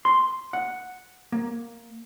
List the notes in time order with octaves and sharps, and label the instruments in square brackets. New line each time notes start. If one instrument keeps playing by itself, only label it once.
[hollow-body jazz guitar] C6
F#5
A#3